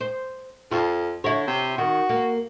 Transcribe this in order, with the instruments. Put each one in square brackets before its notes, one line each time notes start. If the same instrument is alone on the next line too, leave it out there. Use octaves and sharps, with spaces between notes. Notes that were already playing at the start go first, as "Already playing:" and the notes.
[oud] C5
[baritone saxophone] F2 [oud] F4
[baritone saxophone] D3 [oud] E4 C#5
[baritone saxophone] C3
[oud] D#3 [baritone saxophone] F#4
[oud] A#3